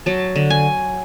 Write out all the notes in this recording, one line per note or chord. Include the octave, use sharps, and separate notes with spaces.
F#3 A5
D3
G#5